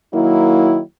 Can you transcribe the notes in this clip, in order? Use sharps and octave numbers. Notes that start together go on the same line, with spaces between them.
D#3 F#3 A#3 E4